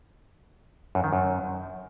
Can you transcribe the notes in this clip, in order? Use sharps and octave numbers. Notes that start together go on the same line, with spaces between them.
F#2
D#3
F#2